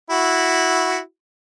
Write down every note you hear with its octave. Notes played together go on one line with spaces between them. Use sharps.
E4 F#4